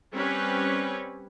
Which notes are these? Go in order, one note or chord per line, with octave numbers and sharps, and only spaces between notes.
G3 C4 C#4 B4 C#5